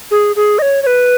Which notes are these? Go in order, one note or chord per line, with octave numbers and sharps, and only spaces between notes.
G#4
G#4
D#5
C#5
C#5
B4